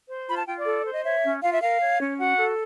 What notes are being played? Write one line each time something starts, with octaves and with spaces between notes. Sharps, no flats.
C5
F4 B5
A5
F4 G5
D5
A4
C5
D#5
C#5 E5
C#4
F4 F5
E5
A#4 F5
C#5
C#4
F#4 F#5
A4